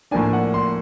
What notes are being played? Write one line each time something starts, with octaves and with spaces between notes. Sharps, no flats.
A2 F3 A#3 D4 G#5
F#5
C6